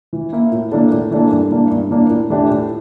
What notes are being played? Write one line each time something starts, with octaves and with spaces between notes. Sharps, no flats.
E3
A#3 E4
A2
E3 A#3 D4 A4
A2
E3 A#3 D4 A4
G2
E3 A#3 D4
G2
E3 A#3 D4
A2
E3 A3 D4 G4
A2